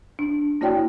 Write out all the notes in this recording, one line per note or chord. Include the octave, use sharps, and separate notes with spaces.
D4
A#3 E4 F#4 C#5 D5 G5